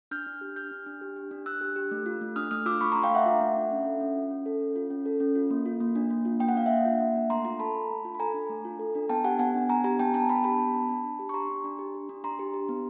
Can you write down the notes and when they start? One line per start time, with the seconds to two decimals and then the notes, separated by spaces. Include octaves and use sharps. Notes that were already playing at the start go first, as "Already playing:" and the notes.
0.11 D4 F6 G6
0.27 D4
0.41 G4
0.56 G4 F6 G6
0.71 D4
0.86 D4
1.01 G4
1.16 G4
1.31 D4
1.46 D4 E6 F#6
1.61 G4
1.76 G4
1.91 A3
2.06 F4
2.21 A3
2.36 D4 D#6 F6
2.51 A3 D#6 F6
2.66 F4 D6 E6
2.81 A3 B5 C#6
2.92 D4 A#5 C6
3.03 F5 G5
3.11 A3 E5 F#5
3.26 F4
3.41 A3
3.56 D4
3.71 C#4
3.85 A4
4.00 C#4
4.16 F4
4.31 C#4
4.46 A4
4.60 C#4
4.76 F4
4.90 C#4
5.06 A4
5.20 C#4
5.35 F4
5.50 A#3
5.66 F4
5.80 A#3
5.96 D4
6.11 A#3
6.25 F4
6.40 A#3 G5
6.49 F#5
6.55 D4 F5
6.66 A#3 E5 F#5
6.85 F4
7.00 A#3
7.15 D4
7.30 A3 A#5 C6
7.45 F4 A#5 C6
7.59 A4 A5 B5
7.75 D4
7.90 A3
8.05 F4
8.15 B5
8.20 A4 G#5 A#5
8.34 D4
8.49 A3
8.65 F4
8.79 A4
8.95 D4
9.09 B3 G5 A5
9.24 G4 F#5 G#5
9.39 B3 F#5 G#5
9.54 D4
9.69 B3 G#5 A#5
9.84 G4 G#5 A#5
9.99 B3 G5 A5
10.14 D4 G5 A5
10.29 B3 A5 B5
10.44 G4 A5 B5
10.60 B3
10.74 D4
10.89 D4
11.04 D4
11.19 G4
11.29 C#6
11.34 G4 A#5 C6
11.49 D4
11.64 D4
11.79 G4
11.94 G4
12.09 D4
12.24 D4 A#5 C6
12.39 G4
12.54 G4
12.69 B3